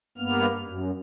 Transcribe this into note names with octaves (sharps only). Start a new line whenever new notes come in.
G2 A#3 B3 F6
F#2